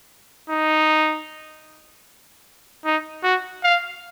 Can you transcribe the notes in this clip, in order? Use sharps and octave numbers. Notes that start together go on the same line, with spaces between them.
D#4
D#4
F#4
F5